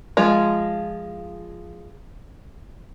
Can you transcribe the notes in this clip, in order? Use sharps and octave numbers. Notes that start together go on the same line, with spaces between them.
F3 G#3 F4